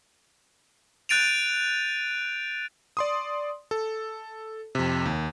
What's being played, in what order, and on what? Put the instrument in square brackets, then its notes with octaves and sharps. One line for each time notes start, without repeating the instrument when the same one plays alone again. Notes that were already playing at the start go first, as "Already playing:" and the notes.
[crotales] F#6 G6 A6 D7 D#7 F7
[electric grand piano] D5 C6 D#6
A4
F2 C3
D#2